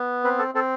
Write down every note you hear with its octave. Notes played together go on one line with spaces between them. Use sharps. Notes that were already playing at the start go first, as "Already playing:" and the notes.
Already playing: B3
C4 B4
A4
C4 A4